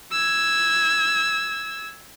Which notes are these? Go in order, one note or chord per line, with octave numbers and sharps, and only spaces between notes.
E6 G#6